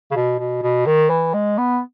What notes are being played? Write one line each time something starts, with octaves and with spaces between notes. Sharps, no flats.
C#3
B2
B2
B2
D#3
E3
G#3
B3